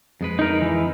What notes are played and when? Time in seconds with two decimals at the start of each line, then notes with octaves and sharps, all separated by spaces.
0.21 F2 G#3 B4
0.39 D#4 A#4
0.62 E3